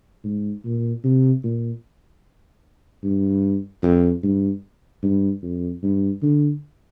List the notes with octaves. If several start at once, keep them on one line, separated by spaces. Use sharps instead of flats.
G#2
A#2
C3
A#2
G2
F2
G2
G2
F2
G2
D3